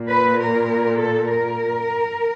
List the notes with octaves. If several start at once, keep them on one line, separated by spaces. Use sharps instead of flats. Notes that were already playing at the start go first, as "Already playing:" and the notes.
Already playing: A#2
B4
A#4
A4
A#4